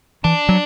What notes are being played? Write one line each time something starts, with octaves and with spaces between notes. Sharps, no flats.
E3 D4
F#3